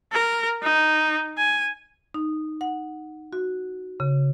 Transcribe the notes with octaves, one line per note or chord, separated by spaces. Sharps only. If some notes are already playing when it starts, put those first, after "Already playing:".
A#4
D#4
G#5
D#4
F#5
F#4
C#3